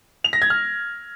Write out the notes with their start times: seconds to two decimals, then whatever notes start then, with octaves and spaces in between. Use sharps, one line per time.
0.24 F7
0.33 A#6
0.42 G#6
0.50 F6